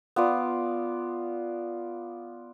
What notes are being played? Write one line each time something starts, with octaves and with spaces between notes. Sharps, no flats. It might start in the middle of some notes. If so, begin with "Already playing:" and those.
B3 F4 D5